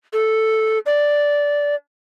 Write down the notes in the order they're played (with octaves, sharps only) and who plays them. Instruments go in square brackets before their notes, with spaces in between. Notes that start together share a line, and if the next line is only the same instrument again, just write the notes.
[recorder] A4
D5